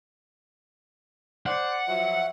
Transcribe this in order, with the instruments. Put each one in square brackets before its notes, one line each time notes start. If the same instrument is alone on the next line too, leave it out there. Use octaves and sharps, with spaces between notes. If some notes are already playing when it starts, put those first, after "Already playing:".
[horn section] C5 D5 [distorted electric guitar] F#5
[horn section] F3 F#3 [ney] E5